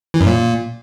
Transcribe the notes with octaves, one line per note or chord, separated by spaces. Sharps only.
E3
F#2
A#2